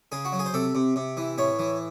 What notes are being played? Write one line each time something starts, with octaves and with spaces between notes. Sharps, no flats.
C#3 G#4
F#4
F#3
G#4
C5
C3 A4
C3
C3
E3
A2 C#5
E3